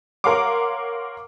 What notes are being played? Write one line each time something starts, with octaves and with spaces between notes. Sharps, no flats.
A#4 C#5 F5 F#5 C6 D6